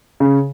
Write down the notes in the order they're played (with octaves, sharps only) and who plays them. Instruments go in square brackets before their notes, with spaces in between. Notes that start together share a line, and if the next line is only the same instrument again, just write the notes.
[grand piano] C#3